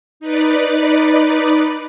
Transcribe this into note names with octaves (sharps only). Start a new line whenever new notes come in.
D#4 B4 D5